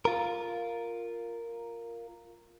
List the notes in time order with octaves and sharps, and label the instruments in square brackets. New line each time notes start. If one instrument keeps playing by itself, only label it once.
[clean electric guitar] F4 A#4